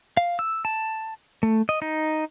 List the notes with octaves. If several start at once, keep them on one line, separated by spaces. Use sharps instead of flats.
F5
E6
A5
A3
D#5
D#4